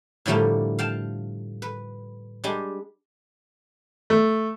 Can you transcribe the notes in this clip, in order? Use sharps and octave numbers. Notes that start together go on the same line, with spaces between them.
A2 D3 F3 G3 A3 A#3
F5 G5 A5
B4
G3 G#3 D4 G4
A3